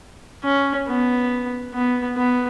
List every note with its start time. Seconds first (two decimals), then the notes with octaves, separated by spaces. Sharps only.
0.44 C#4
0.88 B3
1.74 B3
2.17 B3